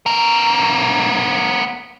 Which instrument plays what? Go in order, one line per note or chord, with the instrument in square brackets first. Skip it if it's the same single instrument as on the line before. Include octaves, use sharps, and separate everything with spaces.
[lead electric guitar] B3 A#4